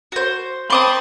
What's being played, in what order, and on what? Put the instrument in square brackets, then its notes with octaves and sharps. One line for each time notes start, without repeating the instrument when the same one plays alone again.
[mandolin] F#4 C5
[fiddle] C4 A5 [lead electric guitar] B5 [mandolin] C6 D6 D#6